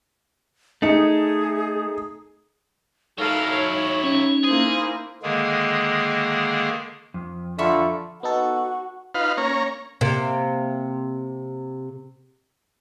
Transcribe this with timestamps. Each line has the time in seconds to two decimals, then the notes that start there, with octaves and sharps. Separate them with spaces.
0.82 A3 D#4 G#4 C#7
3.18 F#3 D#4 E4 A4 A#4 F5
3.52 C#5
4.04 C#4
4.44 A#3 E4 G#4 C5
5.23 D3 D#3 G#3 A#3 G#4
7.14 F2
7.59 D3 F4 E5 B5 C#6
8.23 B3 D#4 F#4 A4
9.15 D#4 F4 B4 F5
9.37 A#3 C#4 C#5 A#5
10.01 C3 A#3